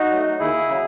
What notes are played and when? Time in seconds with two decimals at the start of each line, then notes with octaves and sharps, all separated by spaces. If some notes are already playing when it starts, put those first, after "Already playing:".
Already playing: D#4 F#4
0.11 F#3 A3
0.39 D#2 E4 G#4
0.68 C#3 F#3